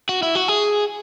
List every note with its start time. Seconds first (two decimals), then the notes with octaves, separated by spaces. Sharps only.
0.09 F#4
0.22 E4
0.35 F#4
0.48 G#4